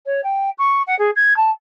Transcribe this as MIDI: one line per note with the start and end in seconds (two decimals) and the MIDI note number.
0.06 0.21 73
0.23 0.50 79
0.58 0.82 85
0.87 0.97 78
0.98 1.10 68
1.16 1.36 92
1.36 1.50 81